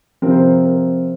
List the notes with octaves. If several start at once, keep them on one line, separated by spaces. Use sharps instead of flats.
C3 F3 C4 A#4
C5
A#4
A#4